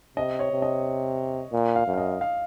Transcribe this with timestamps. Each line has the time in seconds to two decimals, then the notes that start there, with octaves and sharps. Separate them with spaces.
0.17 C3 D#5
0.39 C#5
0.51 C3
0.62 D#5
1.53 A#2
1.76 F5
1.87 F#2
1.94 F5
1.98 D#5
2.21 F5